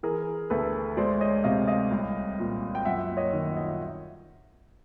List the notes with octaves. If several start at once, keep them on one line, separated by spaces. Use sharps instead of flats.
E3 G#4 A#4
D2 A4 B4
G#3 C5 D5
C#5 D#5
C3 D#5 F5
D#5 F5
C2
A#2
G5
F#2 E5 F#5
C#5 D#5
D#3
D#5
E5